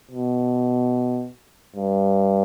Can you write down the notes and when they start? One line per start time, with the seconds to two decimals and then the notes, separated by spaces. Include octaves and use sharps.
0.11 B2
1.76 G2